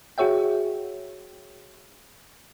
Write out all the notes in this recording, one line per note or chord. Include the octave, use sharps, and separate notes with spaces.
F#4 G#4 C#5 E5 G5